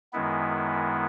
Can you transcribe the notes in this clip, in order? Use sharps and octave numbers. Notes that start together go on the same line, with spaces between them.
F#2 D#3 G#3 B3 E4